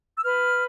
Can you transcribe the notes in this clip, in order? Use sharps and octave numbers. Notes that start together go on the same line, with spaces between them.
E6
B4 F6